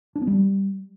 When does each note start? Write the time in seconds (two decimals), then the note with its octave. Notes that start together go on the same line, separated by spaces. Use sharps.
0.16 D4
0.21 B3
0.27 G3